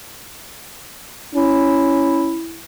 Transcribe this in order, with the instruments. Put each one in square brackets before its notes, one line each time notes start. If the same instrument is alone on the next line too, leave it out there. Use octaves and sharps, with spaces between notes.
[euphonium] C#4 [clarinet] E4